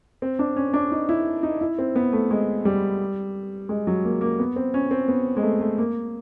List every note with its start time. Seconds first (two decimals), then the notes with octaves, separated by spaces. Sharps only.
0.22 C4
0.39 D4
0.56 C#4
0.74 D4
0.92 D#4
1.09 E4
1.43 D#4
1.61 E4
1.78 C4
1.95 B3
2.13 A3
2.31 G#3
2.65 G3
3.69 G#3
3.87 F#3
4.05 A#3
4.21 A#3
4.39 B3
4.56 C4
4.74 C#4
4.91 C4
5.08 B3
5.37 G#3
5.43 A3
5.61 A3
5.78 A#3